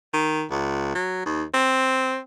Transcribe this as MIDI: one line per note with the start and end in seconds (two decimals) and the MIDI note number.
0.13 0.44 51
0.51 0.90 37
0.95 1.21 54
1.26 1.43 39
1.54 2.19 60